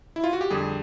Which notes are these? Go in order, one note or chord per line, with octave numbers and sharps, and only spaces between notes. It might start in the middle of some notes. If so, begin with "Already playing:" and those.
E4
F4
F#4
G4
F2 D3 G3 G#4